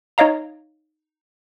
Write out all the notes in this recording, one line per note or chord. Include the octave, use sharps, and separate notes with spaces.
D#4 C#5 D#5 F5 A#5